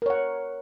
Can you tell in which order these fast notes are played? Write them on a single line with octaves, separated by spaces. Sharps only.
A#4 C#5 F#5